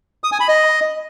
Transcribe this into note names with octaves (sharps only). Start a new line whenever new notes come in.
D#6
G#5
B5
D#5